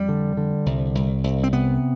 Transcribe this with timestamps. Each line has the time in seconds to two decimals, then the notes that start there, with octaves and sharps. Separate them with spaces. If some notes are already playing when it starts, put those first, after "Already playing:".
Already playing: F2 G3
0.09 D3
0.37 D3
0.66 C2
0.95 C2
1.24 C2
1.43 C4
1.53 C3 B3